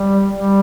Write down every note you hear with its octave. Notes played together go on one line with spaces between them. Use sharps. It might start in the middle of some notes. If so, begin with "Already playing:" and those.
Already playing: G3
G3